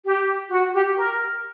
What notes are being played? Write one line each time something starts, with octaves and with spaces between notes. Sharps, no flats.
G4
F#4
G4
A#4